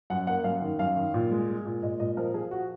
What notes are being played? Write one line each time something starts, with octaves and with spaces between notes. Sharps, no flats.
F#2 F#5
A#3 F#5
F#2 F5
D#3
F#2 F5
D#3
A#2
G#3
G#3
A#2
A#2 D#5
A#2 D#5
F3 A#4
F3 G#4
F#4